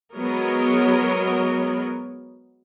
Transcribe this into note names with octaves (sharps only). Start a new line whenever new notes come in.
F#3 G#3 B3 A#4 C#5 D#5